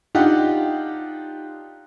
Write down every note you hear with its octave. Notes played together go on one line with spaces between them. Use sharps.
D4 D#4 F4 G4 F#5